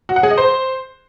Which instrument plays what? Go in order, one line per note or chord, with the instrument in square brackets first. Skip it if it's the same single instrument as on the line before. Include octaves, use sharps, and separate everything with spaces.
[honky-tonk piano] F#4
F#5
G#4
D#5
C5